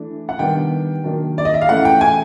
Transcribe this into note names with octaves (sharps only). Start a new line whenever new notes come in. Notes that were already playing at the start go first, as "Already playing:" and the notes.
Already playing: E3 A3 D4
F#5
D#3 G3 B3 D4 G5
D#3 F#3 A#3 D4
D5
D#5
E5
F5
E3 A3 C#4 F#5
G5
G#5